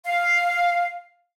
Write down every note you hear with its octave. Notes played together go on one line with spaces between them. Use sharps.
F5